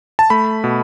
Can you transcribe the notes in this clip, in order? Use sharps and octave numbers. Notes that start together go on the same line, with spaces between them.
A5
A3 B5
B2